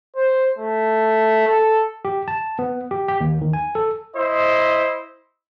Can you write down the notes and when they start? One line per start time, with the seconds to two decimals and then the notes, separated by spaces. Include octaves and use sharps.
0.16 C5
0.59 A3
1.47 A4
2.05 G4
2.28 A5
2.59 B3
2.91 G4
3.08 G4
3.20 D#2
3.41 D#3
3.53 G#5
3.75 A4
4.15 E4 C5 D#5